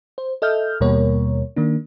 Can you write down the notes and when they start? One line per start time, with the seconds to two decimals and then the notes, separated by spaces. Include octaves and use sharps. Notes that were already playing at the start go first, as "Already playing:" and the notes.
0.18 C5
0.42 A4 D#5 E5 F6 G6
0.81 D#2 B2 G3 A#3 A#4 C#5
1.56 D#3 A#3 D4